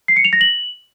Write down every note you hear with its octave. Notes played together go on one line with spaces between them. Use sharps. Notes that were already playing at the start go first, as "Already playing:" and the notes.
C7
C#7
F7
A#6
F#7